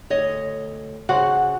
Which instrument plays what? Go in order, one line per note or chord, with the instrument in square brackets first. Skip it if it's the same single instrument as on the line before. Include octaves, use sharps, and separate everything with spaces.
[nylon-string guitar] D2 C#5 D#5
[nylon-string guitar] C#3 [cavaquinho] F#4 C5 F#5